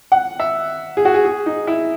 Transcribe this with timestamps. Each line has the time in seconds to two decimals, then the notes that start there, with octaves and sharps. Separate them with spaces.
0.12 F#5
0.40 E5
0.97 G#4
1.05 F#4
1.14 G#4
1.25 G#4
1.46 D#4
1.67 E4